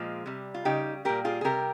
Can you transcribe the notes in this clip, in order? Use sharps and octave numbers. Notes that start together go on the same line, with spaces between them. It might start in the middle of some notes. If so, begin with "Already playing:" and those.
Already playing: A#2 F3 G#3
C3 G3
F4
C#3 G3 D#4 G4
A#2 G3 G4 A#4
F4 G#4
G#4
C3 G3 G4 A#4